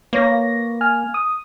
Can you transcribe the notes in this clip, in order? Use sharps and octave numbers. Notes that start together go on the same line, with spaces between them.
A#3 B4 C#5 A#6
G#5 F6
D#6